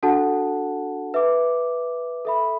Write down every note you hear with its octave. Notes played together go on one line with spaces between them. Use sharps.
D4 F#4 A4 F#5 A5
B4 E5 D6
A4 E5 B5